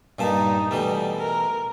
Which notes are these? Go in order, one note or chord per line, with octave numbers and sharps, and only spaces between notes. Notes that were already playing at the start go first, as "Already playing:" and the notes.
G2 A#2 D#4 A5
B2 E3 G3 A3
A#4